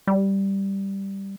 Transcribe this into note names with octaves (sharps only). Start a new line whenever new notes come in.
G3